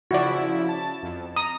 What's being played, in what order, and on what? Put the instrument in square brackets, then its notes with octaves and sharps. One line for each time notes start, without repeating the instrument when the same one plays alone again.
[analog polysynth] C#3 F3 E4 [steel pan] F#4 D5
[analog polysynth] A5
F2
[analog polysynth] A#5 [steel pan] D#6